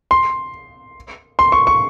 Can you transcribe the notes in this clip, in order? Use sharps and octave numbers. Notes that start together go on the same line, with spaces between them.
C6
C6
C#6
C#6